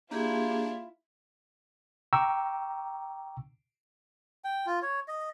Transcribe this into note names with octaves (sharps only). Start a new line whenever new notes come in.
A#3 D4 E4 F4 G4 G#4
G5 A#5 C#6 D6 E6
G5
F4
C#5
D#5